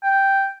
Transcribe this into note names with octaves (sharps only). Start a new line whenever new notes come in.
G5